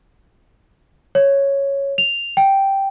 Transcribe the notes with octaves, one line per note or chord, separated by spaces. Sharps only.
C#5
F7
G5